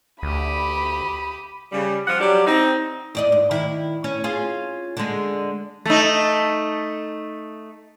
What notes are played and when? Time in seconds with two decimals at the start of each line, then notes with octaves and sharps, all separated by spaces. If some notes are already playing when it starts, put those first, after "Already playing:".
0.23 D2 G4 B5 D#6
1.72 C#3 G3
2.07 F3 F#5
2.19 F#3 G3 D4 G4
2.46 C4 D#4
3.15 E2 D5 D#5
3.32 G#2
3.51 D#3 E4
4.04 C#4
4.24 C#4 F4 G#4
4.97 D3 G#3
5.86 A3 D#4